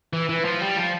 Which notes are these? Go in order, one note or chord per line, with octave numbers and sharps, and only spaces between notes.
E3
E3
F3
G3
F3